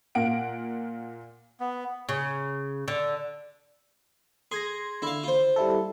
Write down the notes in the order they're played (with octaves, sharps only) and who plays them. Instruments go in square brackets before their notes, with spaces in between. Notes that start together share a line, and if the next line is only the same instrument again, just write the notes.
[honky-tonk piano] A#2 A#3 F#5 D7
[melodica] B3
[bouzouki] C#3
D3
[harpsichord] G#4 [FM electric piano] C6 G#6 A#6
[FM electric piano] D3 [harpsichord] E4 F5
[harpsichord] F4 C5
[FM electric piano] G3 E4 A4